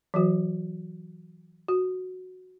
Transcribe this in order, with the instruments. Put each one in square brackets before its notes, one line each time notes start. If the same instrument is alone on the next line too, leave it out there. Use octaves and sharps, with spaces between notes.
[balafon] E3 F#3 F#4 C5
F#4